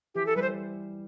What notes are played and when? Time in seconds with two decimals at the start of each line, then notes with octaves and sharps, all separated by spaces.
0.15 E3 G4
0.26 A4
0.36 G3 B4
0.42 C5